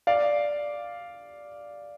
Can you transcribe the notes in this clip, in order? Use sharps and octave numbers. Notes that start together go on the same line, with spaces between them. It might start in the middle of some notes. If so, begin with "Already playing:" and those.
D5 F5